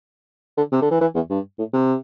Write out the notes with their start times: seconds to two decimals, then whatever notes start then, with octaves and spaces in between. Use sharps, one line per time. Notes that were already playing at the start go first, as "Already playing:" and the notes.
0.57 D3
0.72 C3
0.82 D3
0.91 E3
1.01 E3
1.15 E2
1.30 G2
1.59 A2
1.73 C3